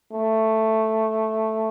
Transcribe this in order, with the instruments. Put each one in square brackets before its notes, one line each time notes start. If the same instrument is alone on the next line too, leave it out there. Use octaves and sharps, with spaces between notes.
[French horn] A3